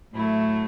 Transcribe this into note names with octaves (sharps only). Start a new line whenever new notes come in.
A2 F#3 A3 E4